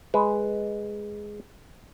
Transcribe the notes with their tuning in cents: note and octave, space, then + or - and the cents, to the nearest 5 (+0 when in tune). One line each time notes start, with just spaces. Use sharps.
G#3 +0 B4 +0